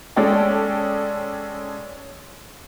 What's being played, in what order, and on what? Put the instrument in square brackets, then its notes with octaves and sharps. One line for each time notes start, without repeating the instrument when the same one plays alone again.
[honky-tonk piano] G#3 C#4 A4 D5 G5